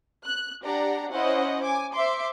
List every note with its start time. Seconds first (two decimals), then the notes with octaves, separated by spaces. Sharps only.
0.24 F#6
0.64 D4 G4 D5 F#5 A#5
1.12 C#4 E4 C5 D#5 F#5
1.63 G#5 D6
1.94 C5 E5 C6 D6